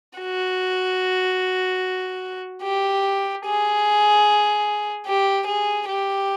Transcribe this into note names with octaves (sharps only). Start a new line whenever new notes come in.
F#4
G4
G#4
G4
G#4
G4